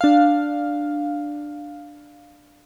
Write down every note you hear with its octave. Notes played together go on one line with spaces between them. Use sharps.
D4 F5